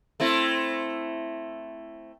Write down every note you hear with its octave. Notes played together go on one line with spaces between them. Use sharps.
A3 C4 E4